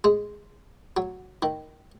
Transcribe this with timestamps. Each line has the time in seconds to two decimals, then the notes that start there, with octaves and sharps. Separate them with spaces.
0.04 G#3
0.97 F#3
1.42 D#3